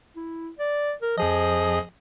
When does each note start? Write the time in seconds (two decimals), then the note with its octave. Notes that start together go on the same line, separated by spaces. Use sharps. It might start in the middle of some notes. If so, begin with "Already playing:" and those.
0.16 E4
0.59 D5
1.02 A#4
1.18 F2 F3 G#4 D#5